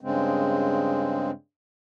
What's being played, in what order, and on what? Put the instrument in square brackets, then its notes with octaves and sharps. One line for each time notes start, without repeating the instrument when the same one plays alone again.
[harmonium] G2 C#3 G#3 C4